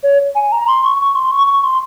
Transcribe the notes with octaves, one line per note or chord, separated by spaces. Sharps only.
C#5
G#5
A#5
C6
C#6
C#6
C6
C#6
C#6
C6